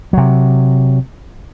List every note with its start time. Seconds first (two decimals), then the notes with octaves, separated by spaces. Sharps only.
0.13 C3 F#3